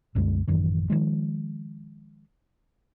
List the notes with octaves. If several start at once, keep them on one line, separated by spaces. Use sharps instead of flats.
C2 F#2 D3 G#3
A1 F#2 D#3 E3
D#3 F3 G#3